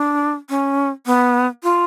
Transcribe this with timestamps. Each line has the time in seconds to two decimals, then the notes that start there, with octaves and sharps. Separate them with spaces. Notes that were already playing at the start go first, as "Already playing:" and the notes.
Already playing: D4
0.49 C#4
1.06 B3
1.63 F4